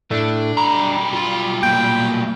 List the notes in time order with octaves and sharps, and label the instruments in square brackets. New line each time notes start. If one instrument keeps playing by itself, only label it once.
[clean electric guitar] A2 A3 [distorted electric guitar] D4
[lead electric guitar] B1 G3 [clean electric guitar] A#5
[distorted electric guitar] F4 C6
[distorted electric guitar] A#3 F4 [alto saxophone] G5